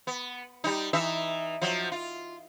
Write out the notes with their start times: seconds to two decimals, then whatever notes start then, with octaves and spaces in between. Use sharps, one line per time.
0.07 B3
0.64 G3 D#4
0.93 E3 D#4 E5
1.61 F3 F#3
1.92 F4